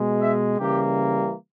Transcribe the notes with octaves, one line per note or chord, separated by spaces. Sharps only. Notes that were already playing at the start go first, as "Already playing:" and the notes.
Already playing: B2 G#3
E5
C#3 E3 G3 A#3 G4